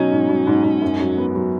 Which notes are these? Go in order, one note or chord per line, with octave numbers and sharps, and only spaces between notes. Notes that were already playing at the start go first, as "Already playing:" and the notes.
Already playing: B2 F#3 C#4 D#4
G#2
F#3
G#2
G#2
F#2
F#3
B3
F#3